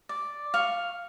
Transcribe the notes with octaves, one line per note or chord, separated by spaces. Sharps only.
D5
F5 C#6